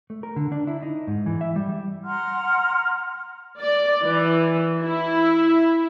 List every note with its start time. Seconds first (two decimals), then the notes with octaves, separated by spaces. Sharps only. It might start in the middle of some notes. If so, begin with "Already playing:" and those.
0.10 A3
0.23 A#4
0.36 D3
0.52 D4
0.67 E4
0.82 D#4
1.07 G#2
1.26 E3
1.41 E5
1.56 G3
2.04 F#5 A#5 C6 F6
3.61 D5
4.03 E3
4.82 E4